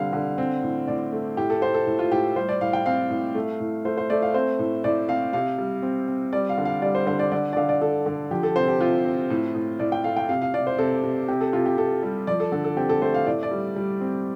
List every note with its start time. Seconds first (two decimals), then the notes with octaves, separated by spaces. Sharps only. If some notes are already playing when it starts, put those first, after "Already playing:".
Already playing: D3 G3 C4 F5
0.13 D3
0.38 C4
0.63 A2
0.88 A2 D5
1.12 A3
1.37 A2 G4
1.50 A4
1.62 A2 C5
1.74 A4
1.87 A2
1.99 F4
2.11 A2 G4
2.36 G3 C5
2.49 D5
2.61 A2 F5
2.73 G5
2.86 C4 F5
3.10 A2
3.35 A3
3.60 A2
3.85 A3 C5
3.98 C5
4.10 A3 D5
4.22 F5
4.34 C4 C5
4.59 A2
4.84 A2 D5
5.09 C4 F5
5.33 C3 F5
5.58 G3
5.83 C4
6.08 C4
6.33 G3 D5
6.49 F5
6.58 D3
6.65 F5
6.82 G3 D5
6.95 C5
7.07 D3 C5
7.19 D5
7.32 D3 D5
7.53 D5
7.57 D3 F5
7.69 D5
7.81 D3 A4
8.06 D3
8.31 F3 G4
8.43 A4
8.56 C3 C5
8.68 G4
8.81 C3 F4
9.05 C4
9.30 A2
9.55 A2
9.79 A2 D5
9.92 G5
10.04 A3 F5
10.17 G5
10.29 C3 F5
10.42 F5
10.54 C3 D5
10.67 C5
10.78 C3 A4
11.03 C3
11.28 C3 G4
11.41 A4
11.53 C3 F4
11.66 G4
11.78 C3 A4
12.03 G3
12.27 F3 D5
12.40 A4
12.52 D3 A4
12.64 A4
12.77 C4 G4
12.89 A4
13.02 A3 C5
13.14 F5
13.26 A2 D5
13.43 D5
13.51 G3
13.76 G3
14.01 C4